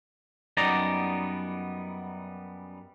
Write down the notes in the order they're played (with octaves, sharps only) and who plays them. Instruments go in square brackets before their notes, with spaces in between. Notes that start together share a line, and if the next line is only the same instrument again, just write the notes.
[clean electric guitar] F#2 G3 B3 D#4 D5 A#5